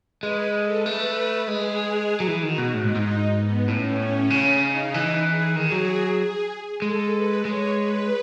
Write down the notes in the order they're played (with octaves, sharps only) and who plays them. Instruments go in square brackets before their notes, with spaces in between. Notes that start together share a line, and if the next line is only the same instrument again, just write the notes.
[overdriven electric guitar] G#3 [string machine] B4
[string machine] A4
[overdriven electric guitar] A3 [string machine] B4
[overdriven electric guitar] G#3 [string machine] G#4
[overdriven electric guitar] F#3
E3
[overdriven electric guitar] D#3 [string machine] F#4
[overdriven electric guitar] B2
[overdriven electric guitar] A2 [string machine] D#4
[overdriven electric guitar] G#2
G#2
[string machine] B3
[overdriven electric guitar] A2 [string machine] C#4
[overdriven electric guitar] C#3
[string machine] D#4
[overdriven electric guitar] E3
[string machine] G#4
[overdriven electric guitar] D#3 [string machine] G#4
[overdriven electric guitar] F#3
[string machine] G#4
[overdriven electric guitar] G#3 [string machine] A4
[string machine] B4
[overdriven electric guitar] G#3 [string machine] C#5
[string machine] B4